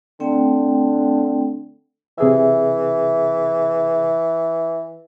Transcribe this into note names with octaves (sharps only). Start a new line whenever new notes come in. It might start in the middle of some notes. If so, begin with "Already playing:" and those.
D3 A3 C4 G5
C3 E3 G#4 E5